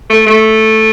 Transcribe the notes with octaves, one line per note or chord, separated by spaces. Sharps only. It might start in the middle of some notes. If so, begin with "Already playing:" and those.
A3
A3